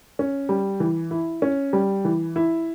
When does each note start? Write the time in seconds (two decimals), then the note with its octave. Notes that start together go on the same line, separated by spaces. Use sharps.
0.19 C#4
0.49 G3
0.80 E3
1.11 E4
1.42 C#4
1.73 G3
2.05 E3
2.36 E4